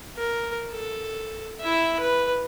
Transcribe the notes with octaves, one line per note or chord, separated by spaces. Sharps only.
A#4
A4
E4 E5
B4